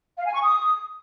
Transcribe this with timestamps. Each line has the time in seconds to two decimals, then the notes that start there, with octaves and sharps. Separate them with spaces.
0.16 F5
0.25 G#5
0.34 C#6
0.42 D#6